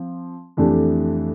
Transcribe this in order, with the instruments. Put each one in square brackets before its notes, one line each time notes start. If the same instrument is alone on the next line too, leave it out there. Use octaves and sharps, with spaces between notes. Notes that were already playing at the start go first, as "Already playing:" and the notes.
Already playing: [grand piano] F3 C4
F2 E3 A3 D4 G4